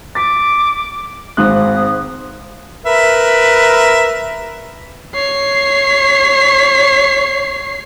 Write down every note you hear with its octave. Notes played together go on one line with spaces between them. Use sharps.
D6 A6 B6
G#1 G#2 D#6 F#6
A#4 B4 E5
C#5 C7